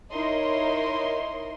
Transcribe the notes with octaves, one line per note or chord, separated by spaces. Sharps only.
D#4 E4 A#4 C#5 D#5 C6